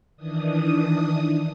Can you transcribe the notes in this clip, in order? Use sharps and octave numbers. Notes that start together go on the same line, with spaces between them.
D#3 E3 D4 D#6